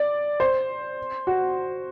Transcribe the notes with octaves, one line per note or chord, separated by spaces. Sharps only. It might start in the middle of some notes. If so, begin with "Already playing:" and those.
Already playing: D5
C5
F#4